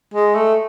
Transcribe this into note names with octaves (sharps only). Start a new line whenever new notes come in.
G#3
A3